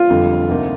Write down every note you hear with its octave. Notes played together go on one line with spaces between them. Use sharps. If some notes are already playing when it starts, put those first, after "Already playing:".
Already playing: F4
F1 F2 D3 G3
D2 C3 F3 A#3 D#4